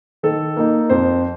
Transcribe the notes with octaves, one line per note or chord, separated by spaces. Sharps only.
D#3 A4
A#3 D#4
F2 C5